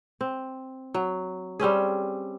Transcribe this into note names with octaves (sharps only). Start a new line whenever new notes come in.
C4
F#3
G3 C4 C#4 G#4